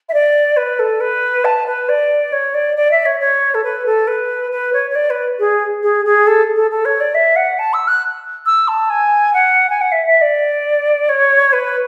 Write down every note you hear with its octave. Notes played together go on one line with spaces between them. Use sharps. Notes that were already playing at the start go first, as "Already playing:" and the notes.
E5
D5
B4
A4
B4
A5
B4
D5
C#5
D5
D5
E5
C#5
C#5
A4
B4
A4
B4
B4
C#5
C#5
D5
B4
G#4
G#4
G#4
A4
A4
A4
C#5
D5
E5
F#5
A5
E6
F#6
E6
A5
G#5
F#5
G#5
F#5
E5
E5
D5
C#5
B4